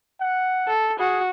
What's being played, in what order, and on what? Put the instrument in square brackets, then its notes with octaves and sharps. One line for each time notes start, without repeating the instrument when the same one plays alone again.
[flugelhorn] F#5
[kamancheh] A4
[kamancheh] F#4 [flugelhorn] G#4